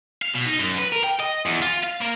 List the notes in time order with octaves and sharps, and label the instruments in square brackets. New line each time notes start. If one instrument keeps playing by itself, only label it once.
[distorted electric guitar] F5
B2
D#4
F#2
B4
A#4
G5
D#5
E2
F4
F5
A#3